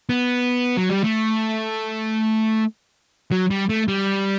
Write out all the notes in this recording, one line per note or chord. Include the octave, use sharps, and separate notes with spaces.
B3
F#3
G3
A3
F#3
G3
A3
G3